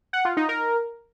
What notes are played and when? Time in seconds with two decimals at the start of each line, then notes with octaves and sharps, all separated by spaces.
0.13 F#5
0.25 F4
0.37 D#4
0.49 A#4